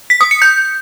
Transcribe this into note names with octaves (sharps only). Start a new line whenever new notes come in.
B6
D#6
C#7
G6